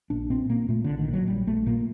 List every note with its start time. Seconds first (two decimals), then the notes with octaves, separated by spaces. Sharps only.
0.10 A#1 D4
0.30 A#2 C4
0.49 A#2 A#3
0.69 A#2 A3
0.84 A#1 D3
0.99 D#3
1.08 A#2
1.13 F#3
1.28 A#1 G3
1.47 A#1 A3
1.66 A#2 A#3